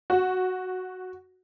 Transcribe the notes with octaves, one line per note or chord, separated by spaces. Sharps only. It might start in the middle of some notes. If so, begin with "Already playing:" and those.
F#4